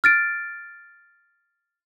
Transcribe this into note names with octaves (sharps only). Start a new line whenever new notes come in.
F6 A6 D7